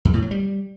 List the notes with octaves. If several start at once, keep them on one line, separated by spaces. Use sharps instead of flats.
F2
A2
F#3
G3